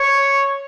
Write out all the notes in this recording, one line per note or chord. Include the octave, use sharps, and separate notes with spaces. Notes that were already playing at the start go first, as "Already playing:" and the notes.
Already playing: C#5